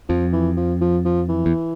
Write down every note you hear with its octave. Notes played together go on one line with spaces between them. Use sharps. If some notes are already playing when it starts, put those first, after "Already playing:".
F2 F3
E3
F3
F3
F3
E3
E2